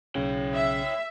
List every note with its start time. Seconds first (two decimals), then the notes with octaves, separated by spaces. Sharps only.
0.15 B1 C#3 C#5 G5
0.54 E5